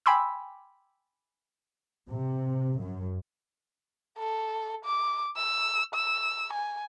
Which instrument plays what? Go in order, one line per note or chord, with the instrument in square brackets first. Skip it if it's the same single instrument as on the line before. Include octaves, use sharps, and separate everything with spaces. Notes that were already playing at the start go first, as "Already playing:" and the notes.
[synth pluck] G5 G#5 B5 C6 D6 E6
[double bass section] C3
F#2
[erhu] A4
D6
E6
E6
G#5